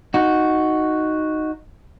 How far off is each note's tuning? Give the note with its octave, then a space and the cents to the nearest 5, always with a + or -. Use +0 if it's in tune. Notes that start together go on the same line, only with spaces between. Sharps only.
D#4 +0 F#4 +0